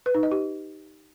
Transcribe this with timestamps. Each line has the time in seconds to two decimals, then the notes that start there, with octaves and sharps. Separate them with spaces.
0.06 B4
0.15 D#4
0.23 D#5
0.32 G4